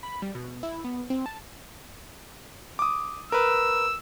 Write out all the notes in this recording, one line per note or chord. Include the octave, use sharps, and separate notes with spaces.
B5
G3
B2
E4
B3
C4
A5
D6 D#6
A#4 B4 E6